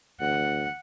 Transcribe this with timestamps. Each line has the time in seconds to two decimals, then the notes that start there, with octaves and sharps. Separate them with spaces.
0.21 D2 F#5